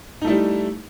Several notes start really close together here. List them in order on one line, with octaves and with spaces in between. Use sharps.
D#4 A3 E4 G3